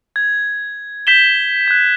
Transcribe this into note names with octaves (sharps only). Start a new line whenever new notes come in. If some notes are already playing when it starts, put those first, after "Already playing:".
G#6
G6 B6 E7 G7
F#6 G#6